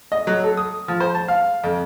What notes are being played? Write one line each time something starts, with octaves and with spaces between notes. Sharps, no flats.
D#5
F#3
A4
D#6
F3
C5
A5
F5
F2